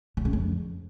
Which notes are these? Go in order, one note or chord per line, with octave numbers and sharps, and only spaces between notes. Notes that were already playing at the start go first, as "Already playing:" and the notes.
B2
C#3
F2